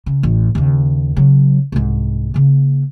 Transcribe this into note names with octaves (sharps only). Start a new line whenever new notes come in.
C#3
A1
D#2 C#3
C#3 F#3
C2 G#2
C#3 A#3